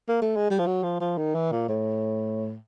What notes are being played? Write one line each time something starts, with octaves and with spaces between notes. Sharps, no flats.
A#3
A3
G#3
G3
F3
F#3
F3
F3
D#3
E3
A#2
A2